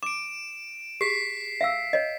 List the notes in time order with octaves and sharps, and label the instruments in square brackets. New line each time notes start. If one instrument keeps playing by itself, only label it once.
[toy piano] D6 [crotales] D7 E7
[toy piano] G4 G#4 [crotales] B6 C7
[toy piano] E5 F5 E6
C#5 D#5